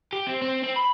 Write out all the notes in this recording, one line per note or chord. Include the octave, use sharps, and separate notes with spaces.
G4
C4
C4
C4
B5